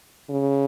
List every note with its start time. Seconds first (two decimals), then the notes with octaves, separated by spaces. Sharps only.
0.30 C#3